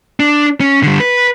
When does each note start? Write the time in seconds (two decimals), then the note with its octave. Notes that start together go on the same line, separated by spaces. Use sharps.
0.20 D4
0.60 C#4
0.83 D3 G3
1.00 B4